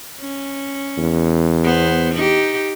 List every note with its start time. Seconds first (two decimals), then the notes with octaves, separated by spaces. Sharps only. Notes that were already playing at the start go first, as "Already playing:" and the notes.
0.20 C#4
0.98 E2
1.64 B3 C5
2.15 D#4 G4